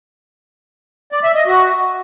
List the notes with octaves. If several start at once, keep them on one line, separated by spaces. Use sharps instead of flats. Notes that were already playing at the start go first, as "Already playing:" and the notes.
D5
E5
D#5
F#4